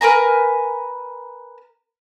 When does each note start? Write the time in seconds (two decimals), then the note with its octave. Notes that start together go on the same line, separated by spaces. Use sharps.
0.01 A#4 B4 G#5 A#5